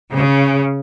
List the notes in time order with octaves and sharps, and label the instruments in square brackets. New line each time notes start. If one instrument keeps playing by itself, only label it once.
[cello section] C#3